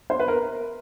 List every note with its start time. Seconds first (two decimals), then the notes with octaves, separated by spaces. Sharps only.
0.10 C5
0.20 B4
0.28 A#4